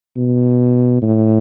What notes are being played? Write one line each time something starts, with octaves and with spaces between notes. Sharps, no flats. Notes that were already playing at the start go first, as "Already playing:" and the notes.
B2
A2